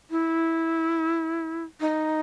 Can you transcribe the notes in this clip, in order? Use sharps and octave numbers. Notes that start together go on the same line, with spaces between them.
E4
D#4